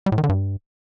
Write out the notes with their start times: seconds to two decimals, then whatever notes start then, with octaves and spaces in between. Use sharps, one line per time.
0.06 G3
0.12 A2
0.18 D#3
0.24 D3
0.29 G2